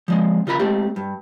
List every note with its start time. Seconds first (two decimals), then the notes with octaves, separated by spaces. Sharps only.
0.08 F3 G#3 C4
0.47 C#3 F4 A#4 B5
0.60 G#3 A3 C4 G4
0.96 G2